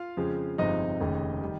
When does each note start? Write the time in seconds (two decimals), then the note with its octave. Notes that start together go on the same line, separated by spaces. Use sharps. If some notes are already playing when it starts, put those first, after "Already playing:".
Already playing: F4 F5
0.17 F2 C#3 F3 G#3
0.58 G1 F2 C3 F3 G#3 D#4 D#5
1.00 F1 D#2 C#3
1.41 D#3 G3